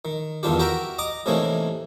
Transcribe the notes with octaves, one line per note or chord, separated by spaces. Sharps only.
D#3
E2 G2 D#3 D4 F4 G4
F#4 G4 A#4 E5 G5 A#5
D#5 A#5 D6 D#6
A2 C3 E3 A#3 C#4 D#4